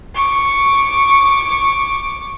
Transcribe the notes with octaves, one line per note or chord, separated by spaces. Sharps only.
C#6 D6